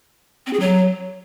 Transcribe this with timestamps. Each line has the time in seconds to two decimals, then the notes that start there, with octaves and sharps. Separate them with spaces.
0.47 C4
0.53 G#4
0.60 F#3